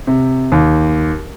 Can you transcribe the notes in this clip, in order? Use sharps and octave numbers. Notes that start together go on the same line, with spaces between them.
C3
D#2